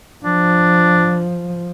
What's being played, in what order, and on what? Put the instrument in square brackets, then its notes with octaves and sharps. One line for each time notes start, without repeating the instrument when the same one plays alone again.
[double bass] F3 [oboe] D4